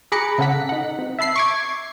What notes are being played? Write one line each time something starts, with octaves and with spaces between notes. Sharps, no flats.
G#4 A#5 B5 D6 F#6 C#7
C#3 A4 F#5 B6
D#4 F#5
C4
E5 A5 B5 C7
C#6 D6 G#6